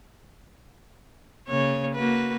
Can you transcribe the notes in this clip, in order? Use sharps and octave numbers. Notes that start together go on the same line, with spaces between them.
C#3 A#3 C#5
A#3 F#4 B4